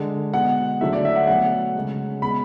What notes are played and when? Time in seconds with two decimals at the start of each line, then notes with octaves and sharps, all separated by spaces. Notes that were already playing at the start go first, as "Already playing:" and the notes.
Already playing: D3 G#3
0.33 B2 G#3 F#5
0.81 D3 F#3 A3 E5
0.93 D5
1.05 E5
1.16 F#5
1.27 B2 F#3 A3 F#5
1.75 C#3 G#3
2.22 B2 G#3 B5